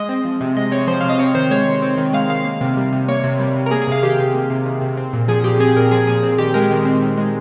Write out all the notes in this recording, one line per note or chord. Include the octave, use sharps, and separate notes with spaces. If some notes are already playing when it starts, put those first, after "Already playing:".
Already playing: G#3 D#5
C4
F3
C3
G#3 D#5
C4 C#5
F3 C5
C3 F5
D#5
C4 C#5
D#3 C5
G#3 C#5
D#3
C4
D#3
G#3 F5
D#3 F5
A#3
C3
G3
C3
A#3 C#5
C3
G3
C3
A#4
A#3 G#4
G#4
C3 F5
D#3 G4
C3
A#3
C3
D#3
C3
C4
A#2
F3 G#4
A#2 G4
C4 G#4
A#2 A#4
F3 G#4
A#2 G#4
C4
D#3 G4
G#3 A#4
D#3
C4
D#3
G#3